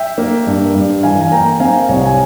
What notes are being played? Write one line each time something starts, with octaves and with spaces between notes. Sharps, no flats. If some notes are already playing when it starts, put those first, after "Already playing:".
Already playing: E5 G5
A#3
G2
G2
E3 F5 G#5
G#5
A#3 G5 A#5
C4 F5 G#5
C2 C#5 F5
G#5